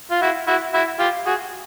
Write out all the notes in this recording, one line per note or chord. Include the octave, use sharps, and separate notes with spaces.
F4
E4 F#4
E4 F#4
E4 F#4
F4 G4
F#4 G#4